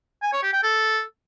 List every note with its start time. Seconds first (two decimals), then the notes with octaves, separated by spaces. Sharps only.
0.22 G#5
0.33 C#5
0.43 G4
0.53 G5
0.63 A4